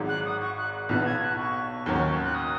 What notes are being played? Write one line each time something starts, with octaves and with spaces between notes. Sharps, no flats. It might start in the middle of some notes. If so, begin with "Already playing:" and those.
Already playing: G#1 G#2 F#3
F#6
D#6
C#6
F#6
B1 B2 B3 F#6
G#6
F#6
C#6
D#2 D#3 F#3 C#4
F#6
D#6